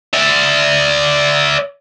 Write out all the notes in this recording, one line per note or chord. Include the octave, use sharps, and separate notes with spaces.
D5 E5